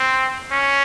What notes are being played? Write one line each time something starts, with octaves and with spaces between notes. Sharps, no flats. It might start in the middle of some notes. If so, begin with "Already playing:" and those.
Already playing: C4
C#4